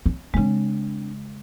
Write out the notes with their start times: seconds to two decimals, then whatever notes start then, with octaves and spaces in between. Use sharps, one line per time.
0.06 C#4
0.34 C#3 G#3 C4 D4